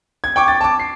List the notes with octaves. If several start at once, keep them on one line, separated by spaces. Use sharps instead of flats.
G#6
G5 C#6 D6
A6
A5 D6
C7